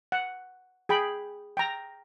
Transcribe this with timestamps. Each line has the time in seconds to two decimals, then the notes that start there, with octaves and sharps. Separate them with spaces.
0.12 F#5
0.89 G#4 G5 B5
1.57 G5 A#5